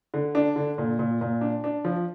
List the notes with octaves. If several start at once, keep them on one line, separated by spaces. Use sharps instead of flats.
D3
D4
D3
A#2
A#2
A#2
D4
D4
F3